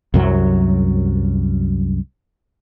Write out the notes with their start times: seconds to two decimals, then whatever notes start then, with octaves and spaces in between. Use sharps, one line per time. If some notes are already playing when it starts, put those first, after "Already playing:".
0.14 C2 F#2 F#3